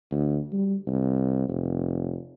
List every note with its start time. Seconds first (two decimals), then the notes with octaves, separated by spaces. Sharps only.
0.12 D2
0.52 G3
0.87 C2
1.49 F1